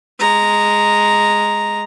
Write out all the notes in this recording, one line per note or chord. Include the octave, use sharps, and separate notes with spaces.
G#3 A#5